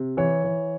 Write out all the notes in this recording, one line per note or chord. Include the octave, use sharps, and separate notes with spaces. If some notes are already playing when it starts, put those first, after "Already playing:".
Already playing: C3
E3 C#5
E3